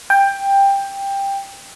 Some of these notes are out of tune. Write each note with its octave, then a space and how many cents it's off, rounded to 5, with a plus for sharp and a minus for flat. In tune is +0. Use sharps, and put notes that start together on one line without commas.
G5 +15